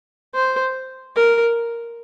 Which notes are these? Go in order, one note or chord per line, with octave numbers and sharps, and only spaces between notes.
C5
A#4